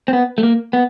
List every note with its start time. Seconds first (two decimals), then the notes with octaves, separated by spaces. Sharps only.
0.08 C4
0.13 B3
0.38 A3
0.43 A#3
0.73 B3